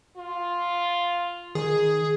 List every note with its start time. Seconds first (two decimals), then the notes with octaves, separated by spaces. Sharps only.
0.17 F4
1.55 D#3 G#4